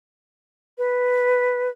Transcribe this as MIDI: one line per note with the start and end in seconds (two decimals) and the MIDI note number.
0.78 1.69 71